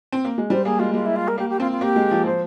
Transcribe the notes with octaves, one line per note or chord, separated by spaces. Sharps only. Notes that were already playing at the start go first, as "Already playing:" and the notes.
C4
A#3
G#3
G3 C5
A#3 G#4
G#3 F4
G#3 F4
E4
F4
A#4
A#3 G4
G4
C4 F4
F4
A#3 G4
G#3
F3
F3 C5